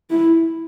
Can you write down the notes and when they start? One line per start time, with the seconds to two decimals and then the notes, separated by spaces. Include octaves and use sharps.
0.10 E4